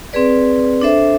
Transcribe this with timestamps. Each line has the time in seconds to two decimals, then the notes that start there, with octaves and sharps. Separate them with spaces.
0.13 C4 G#4 B4 D5
0.81 D4 A4 C5 E5